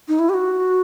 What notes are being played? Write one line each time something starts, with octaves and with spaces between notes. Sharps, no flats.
D#4
E4
G4
F#4